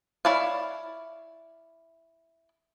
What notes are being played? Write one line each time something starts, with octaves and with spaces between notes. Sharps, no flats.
E4 C#5 D5 F5